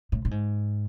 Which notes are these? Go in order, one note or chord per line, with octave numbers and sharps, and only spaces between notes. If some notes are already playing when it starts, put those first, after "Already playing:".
A2
A2
G#2